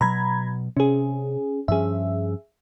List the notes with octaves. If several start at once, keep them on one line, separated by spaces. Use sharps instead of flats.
B2 F#3 A#5 B5 G#6
C3 C#4 G#4
G2 F3 C#4 G#4 E5